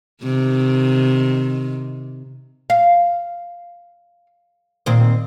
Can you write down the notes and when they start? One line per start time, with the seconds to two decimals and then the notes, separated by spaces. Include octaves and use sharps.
0.23 C3 D#3
2.70 F5
4.86 A#2 D#3 C4